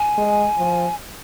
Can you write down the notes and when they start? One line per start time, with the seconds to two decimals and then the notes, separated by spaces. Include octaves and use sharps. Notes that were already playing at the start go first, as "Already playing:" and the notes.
Already playing: G#5
0.18 G#3
0.58 F3